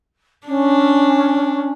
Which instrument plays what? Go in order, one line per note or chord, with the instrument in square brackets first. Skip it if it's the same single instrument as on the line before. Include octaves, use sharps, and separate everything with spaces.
[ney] C#4 [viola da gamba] D4